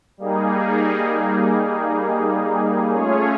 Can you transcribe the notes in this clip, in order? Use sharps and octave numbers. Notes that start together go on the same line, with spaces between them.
G3 A#3 D#4 G#4
A3 C#4 F4 G#4 C#5